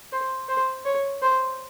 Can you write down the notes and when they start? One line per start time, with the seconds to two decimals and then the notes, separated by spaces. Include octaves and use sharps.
0.12 C5
0.49 C5
0.85 C#5
1.22 C5